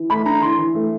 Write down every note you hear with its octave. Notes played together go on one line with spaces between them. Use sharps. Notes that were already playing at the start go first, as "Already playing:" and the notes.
Already playing: E3
A3 B5
D4 A#5
E3 C6
E3
A3